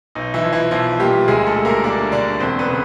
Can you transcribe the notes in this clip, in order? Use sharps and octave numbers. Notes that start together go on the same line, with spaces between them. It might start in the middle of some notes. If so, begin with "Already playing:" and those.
B1 D#4
E3 E4
F3
E3 E4
B1 F3 F4
A#2 G3 G4
D2 G#3 G#4
A3 A4
G3
A#3 A#4
A#3 D4 D5
D3 D4 D5
E1 C4 C5
B3 B4
C#3